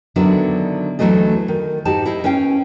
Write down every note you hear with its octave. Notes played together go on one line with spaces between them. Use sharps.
D3 D#3 F#3 B3 D4 E4
D2 C3 E3 F#3 A3 D#5
D#3
G#2 D#4 F#4 G4 A5
E4 D#5 F5
C#4 B4 F5 G5